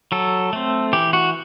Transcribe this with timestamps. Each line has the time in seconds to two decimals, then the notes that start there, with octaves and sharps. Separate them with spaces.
0.12 F#3 A4
0.53 A3 C4
0.93 E3 G4
1.13 F#4